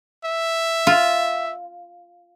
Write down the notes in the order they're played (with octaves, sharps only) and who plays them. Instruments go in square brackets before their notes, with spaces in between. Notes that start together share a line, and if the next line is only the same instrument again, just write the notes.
[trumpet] E5
[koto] F4